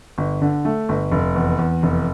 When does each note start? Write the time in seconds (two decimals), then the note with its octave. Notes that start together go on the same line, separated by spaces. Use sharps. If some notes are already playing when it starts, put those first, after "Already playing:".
0.18 G1
0.42 D3
0.65 A3
0.89 G1
1.12 F1
1.36 E2
1.59 E2
1.83 F1